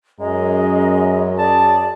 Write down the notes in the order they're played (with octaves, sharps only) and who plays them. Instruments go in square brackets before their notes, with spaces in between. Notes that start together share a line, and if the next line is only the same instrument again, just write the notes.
[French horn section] F#2 [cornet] G#3 [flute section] G#4 D#5 A#5
[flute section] G#4 D5 [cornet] A5